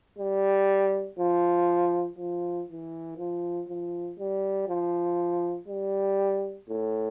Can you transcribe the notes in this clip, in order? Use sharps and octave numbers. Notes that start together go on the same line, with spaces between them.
G3
F3
F3
E3
F3
F3
G3
F3
G3
A2